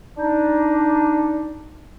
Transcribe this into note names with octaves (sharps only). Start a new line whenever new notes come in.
D4 D#4